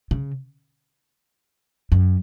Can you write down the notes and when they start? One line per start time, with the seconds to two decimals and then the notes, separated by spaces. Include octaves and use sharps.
0.11 C#3
1.92 F#2